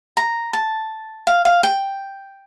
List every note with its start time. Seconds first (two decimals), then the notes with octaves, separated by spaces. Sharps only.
0.17 A#5
0.53 A5
1.27 F5
1.45 F5
1.63 G5